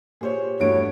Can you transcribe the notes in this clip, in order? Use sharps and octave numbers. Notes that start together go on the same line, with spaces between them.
A#2 G4 G#4 C5 C#5
E2 G2 E3 A3 F#4 C#5 D7